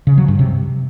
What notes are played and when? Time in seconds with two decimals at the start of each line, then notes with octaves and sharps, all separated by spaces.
0.07 C#3
0.18 F#3
0.28 G2
0.39 C3